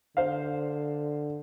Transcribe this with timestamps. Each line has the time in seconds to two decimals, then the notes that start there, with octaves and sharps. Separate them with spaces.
0.17 D3 C5 F5